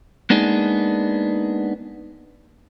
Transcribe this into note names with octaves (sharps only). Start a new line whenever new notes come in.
G#3 A#3 B3 D4 D#4 G#4